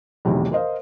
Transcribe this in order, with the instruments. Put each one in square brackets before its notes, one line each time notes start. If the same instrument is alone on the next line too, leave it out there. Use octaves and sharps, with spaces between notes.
[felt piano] B1 E2 A2 C3 D#3 E3
A#4 C5 D#5 F5